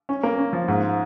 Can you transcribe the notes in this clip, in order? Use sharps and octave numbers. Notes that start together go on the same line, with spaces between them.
C#4
A#3
C#4
F3
G#2